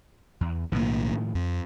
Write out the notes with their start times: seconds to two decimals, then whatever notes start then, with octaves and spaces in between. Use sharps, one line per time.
0.41 E2
0.72 B1 A2 D#3 F3 A#3
1.35 F2